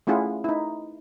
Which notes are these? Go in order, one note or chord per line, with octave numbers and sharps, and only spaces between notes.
A3 C#4 E4 F4 G#4 F#5
D#4 E4